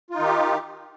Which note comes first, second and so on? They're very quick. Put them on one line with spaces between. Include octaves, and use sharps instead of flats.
F4 D#4 D#3 G4